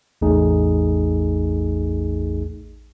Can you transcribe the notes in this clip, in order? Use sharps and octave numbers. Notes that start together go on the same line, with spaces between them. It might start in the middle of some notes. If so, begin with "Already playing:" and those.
A1 E2 A3 D#4 G#4